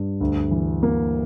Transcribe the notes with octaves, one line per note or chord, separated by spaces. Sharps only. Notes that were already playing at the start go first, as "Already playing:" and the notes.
Already playing: G2
D2
E3
A#3